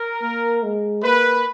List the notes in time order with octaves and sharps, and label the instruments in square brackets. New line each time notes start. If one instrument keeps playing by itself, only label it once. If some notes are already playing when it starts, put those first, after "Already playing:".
Already playing: [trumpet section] A#4
[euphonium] A#3
G#3
[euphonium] A#3 [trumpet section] B4